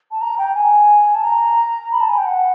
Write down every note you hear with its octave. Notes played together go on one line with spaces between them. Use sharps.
A5
A#5
G5
G#5
A5
A#5
B5
A5
G#5
G5
F#5